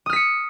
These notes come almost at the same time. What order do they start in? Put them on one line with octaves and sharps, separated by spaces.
D#6 F6 B6 C#7